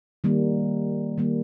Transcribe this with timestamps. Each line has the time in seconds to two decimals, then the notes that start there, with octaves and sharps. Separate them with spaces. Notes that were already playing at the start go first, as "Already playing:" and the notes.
0.24 D#3 G3 A#3
1.18 D#3 G3 A#3